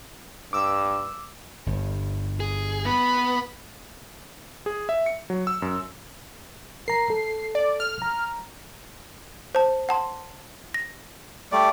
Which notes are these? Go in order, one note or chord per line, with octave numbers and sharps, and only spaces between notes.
G2 D6 E6
G1 G2
G#4
B3 B5
G#4
E5
C#7
F#3
E6
F#2
A#4 A#5 C7
A4
D5
F6
A#5
C5 A5
F#5 A5 C6
A#6
G3 A3 D5